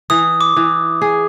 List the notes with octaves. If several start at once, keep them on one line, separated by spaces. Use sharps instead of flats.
E3 D#6
D6
E3
G#4